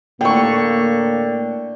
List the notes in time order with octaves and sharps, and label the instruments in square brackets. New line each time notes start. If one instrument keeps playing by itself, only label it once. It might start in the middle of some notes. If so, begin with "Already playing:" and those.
[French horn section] A2 A#3 [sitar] D3 [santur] G5 C#6